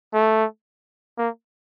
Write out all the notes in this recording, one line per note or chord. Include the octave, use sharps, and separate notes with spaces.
A3
A#3